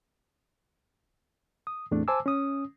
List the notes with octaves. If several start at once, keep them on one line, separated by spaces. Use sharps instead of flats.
D#6
E2 A2 A3 C4 D4
C5 G#5 A5 D6 E6
C#4 D#6